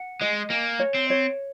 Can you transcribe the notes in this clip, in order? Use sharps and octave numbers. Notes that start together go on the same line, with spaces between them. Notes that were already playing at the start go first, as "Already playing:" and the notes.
Already playing: F#5
G#3 D#5
A#3 G#5
C#5
C4
C#5